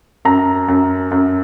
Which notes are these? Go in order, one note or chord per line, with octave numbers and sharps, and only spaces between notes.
F#2 A#5
F#2
F#2